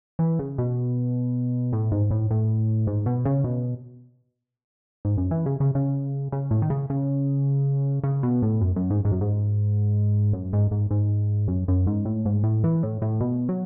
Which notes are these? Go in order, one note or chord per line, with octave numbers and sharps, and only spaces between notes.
E3
C#3
B2
A2
G#2
A2
A2
G#2
B2
C#3
B2
G#2
F#2
E3
C#3
C#3
C#3
C#3
A2
D#3
C#3
C#3
C#3
B2
A2
F#2
F#2
G#2
G#2
F#2
G#2
F#2
G#2
G#2
G#2
F#2
F#2
G#2
A2
G#2
A2
E3
A2
A2
B2
F#3